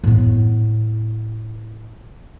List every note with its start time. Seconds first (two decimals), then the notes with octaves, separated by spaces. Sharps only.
0.04 A2 B3